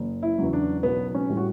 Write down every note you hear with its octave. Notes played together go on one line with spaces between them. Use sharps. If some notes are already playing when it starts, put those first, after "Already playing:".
Already playing: F#1
E4
E2 C#3 F#3
D4
B1 B3
C#4
A2 G3
F#4